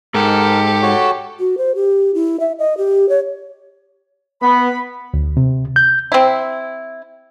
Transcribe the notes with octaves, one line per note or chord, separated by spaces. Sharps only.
G#2 G4 A4 A#4
F#4 C#5
F#4
C5
G4
E4
E5
D#5
G4
C#5
B3 B5
D2
C3
G6
C4 E4